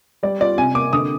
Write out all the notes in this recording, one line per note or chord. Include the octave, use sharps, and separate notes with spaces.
G3 D5
F4 D5
C3 G#5
A#3 D6
D3 D#6